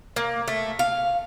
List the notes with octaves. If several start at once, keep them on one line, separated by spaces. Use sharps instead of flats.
A#3
A3
F5